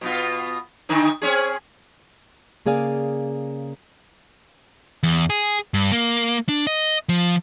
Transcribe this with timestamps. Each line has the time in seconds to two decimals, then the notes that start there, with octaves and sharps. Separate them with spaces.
0.01 B2 B3 F4
0.89 D3 D#3 D#4
1.22 C4 C#4 G#4
2.66 C#3 A#3 G#4 D5 F5 G#5
5.03 E2
5.30 G#4
5.74 G2
5.92 A#3
6.49 D4
6.67 D#5
7.09 F3